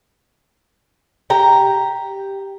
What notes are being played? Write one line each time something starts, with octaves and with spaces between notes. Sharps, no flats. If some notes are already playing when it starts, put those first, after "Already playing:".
G4 A#5